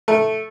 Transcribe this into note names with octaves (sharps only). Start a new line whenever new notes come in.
A3